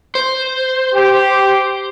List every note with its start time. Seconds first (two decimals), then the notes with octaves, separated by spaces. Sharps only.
0.15 C5
0.94 G4